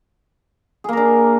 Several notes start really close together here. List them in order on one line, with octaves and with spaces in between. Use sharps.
G#4 A#3 A#4 D4